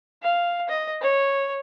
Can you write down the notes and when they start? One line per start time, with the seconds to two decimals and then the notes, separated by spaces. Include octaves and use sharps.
0.22 F5
0.69 D#5
1.01 C#5